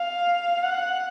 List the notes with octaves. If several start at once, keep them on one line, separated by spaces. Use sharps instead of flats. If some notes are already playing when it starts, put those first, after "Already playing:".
Already playing: F5
F#5